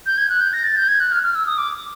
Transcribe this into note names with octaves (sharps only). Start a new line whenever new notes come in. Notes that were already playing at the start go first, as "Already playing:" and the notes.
G6
G#6
F#6
G6
A#6
A6
G6
G#6
F#6
F6
F6
E6
D#6
D6